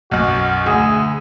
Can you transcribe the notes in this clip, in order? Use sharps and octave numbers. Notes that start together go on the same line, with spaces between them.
B1 F#2 F#4
D2 G#4